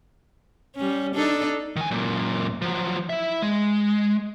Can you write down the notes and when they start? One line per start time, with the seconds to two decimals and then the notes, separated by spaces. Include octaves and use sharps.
0.76 G3 C#4
1.15 D4 D#4 A4
1.76 D#3 G#5
1.91 F#2 A#2
2.62 F3 F#3
3.10 E4 E5
3.42 G#3